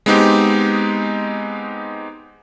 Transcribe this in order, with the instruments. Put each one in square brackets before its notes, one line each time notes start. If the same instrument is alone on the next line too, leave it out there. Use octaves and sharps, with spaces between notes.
[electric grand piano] G#3 B3 C4 D#4 G4